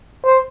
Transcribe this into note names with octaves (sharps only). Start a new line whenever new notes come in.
C5